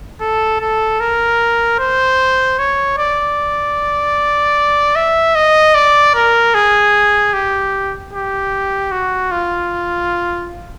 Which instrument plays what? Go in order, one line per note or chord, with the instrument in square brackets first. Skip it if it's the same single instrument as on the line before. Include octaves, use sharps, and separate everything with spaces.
[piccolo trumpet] A4
A4
A#4
C5
C#5
D5
E5
D#5
D5
A#4
G#4
G4
G4
F#4
F4